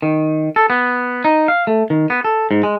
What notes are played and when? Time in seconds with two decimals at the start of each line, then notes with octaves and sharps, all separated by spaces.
0.02 D#3
0.56 A4
0.70 B3
1.25 D#4
1.48 F5
1.67 A3
1.90 D#3
2.10 B3
2.24 A4
2.51 G#2
2.63 G#3